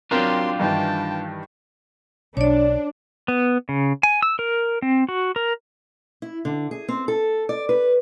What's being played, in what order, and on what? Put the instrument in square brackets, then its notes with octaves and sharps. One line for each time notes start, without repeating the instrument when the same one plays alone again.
[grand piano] F#3 C4 A#4 [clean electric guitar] D4 F4 G4 [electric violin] C6
[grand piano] G2 D#3 E3 [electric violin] G5 A5
[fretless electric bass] B1 [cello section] D4 [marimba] C#5 D5
[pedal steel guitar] B3
C#3
G#5
E6
A#4
C4
F#4
A#4
[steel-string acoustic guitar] E4
D3
G#4
C4
A4
D5
B4